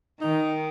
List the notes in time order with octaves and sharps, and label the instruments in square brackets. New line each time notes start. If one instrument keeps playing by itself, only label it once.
[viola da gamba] D#3 [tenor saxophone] D#4